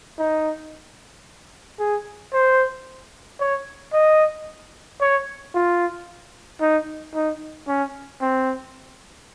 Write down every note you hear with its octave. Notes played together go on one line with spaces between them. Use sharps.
D#4
G#4
C5
C#5
D#5
C#5
F4
D#4
D#4
C#4
C4